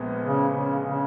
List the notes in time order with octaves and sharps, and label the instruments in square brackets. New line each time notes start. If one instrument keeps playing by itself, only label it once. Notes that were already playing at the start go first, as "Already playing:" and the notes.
Already playing: [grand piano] A#1 A#2 G#3 B3
[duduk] C#3
C#3
C#3